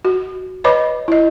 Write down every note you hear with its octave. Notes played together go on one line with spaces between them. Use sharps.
F#4
B4 C#5 D#5 B5 D6
E4 D#5